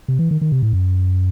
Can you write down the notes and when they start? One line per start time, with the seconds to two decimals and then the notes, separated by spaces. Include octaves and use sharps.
0.08 C3
0.19 E3
0.31 D#3
0.41 D#3
0.52 C3
0.63 A2
0.73 F#2